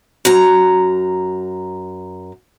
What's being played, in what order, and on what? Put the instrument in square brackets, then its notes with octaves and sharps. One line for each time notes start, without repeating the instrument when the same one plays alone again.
[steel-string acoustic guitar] F#2 A#5